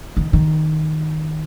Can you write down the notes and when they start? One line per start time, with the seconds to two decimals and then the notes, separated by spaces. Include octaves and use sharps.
0.17 D#3
0.33 D#3